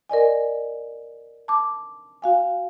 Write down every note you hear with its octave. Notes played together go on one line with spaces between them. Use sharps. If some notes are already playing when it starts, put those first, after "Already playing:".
A#4 D5 D#5 G#5
A5 D6
F#4 F5 G#5